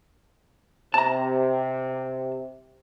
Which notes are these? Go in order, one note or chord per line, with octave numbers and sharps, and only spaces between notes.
C3 A5 A#5